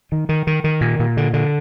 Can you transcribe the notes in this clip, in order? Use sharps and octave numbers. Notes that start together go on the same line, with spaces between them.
D#3
D#3
D#3
D#3
A#2
A#2
D3
D3